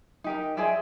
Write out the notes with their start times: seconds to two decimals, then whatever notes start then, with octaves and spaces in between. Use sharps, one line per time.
0.24 D#4 G4 A#4
0.57 G#4 C5 D5 E5